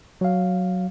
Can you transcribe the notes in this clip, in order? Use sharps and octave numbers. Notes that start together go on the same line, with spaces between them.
F#3 F5